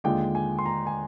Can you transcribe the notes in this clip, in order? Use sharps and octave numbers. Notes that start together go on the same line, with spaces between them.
D#2 D3 G#3 D4 F4 G5
G#5
C6
A#5
G#5